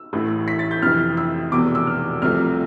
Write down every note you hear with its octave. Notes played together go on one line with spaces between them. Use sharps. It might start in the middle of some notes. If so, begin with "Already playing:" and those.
Already playing: E6
A1 A2 E3
B6
A6
G6
F2 C3 E3 F6
E6
F1 E2 B2 D6
E6
F6
C2 C3 F3 A3 F6